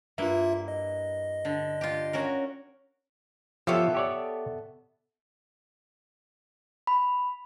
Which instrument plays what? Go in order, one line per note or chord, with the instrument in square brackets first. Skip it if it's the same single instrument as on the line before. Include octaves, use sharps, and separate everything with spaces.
[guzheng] G2 A#3 E4 [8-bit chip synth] F4 E5
[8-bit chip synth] D#5
[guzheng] D3
F4 G4
C#4 F#4 A#4
[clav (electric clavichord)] F3 G4 C#5 [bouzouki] B3 A4 E5
[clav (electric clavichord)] G4 C#5 D5
[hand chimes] B5